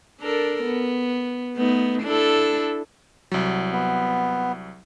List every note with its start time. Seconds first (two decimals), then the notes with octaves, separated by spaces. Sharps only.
0.21 D4 A4 A#4
0.64 B3
1.56 A3 B3 D#4
2.02 D4 E4 A4
3.32 C2 F#3
3.73 B3